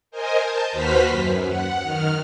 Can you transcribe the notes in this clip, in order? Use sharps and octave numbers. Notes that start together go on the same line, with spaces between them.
A#4 C5 D#5 G#5
A5 G6
D#2 F#4 B4 C5 F6 B6
F#2
F#5
D#3 F6